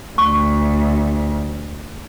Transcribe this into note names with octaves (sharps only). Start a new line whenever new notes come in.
D2 C#6